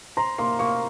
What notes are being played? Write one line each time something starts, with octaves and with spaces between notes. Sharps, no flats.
C5 A#5
A#3 C6
A#3 C#6